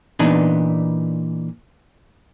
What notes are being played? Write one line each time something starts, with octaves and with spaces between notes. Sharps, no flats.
A#2 E3 B3 D4 D#4